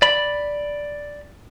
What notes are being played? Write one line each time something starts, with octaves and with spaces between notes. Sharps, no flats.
D5 B5